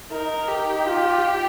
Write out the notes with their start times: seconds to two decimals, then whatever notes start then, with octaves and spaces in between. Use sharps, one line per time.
0.11 D#4 A#4
0.49 G4
0.86 F4